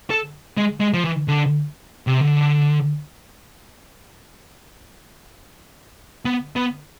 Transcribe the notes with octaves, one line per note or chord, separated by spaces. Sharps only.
A4
G#3
G#3
F3
E3
D3
C3
D3
B3
B3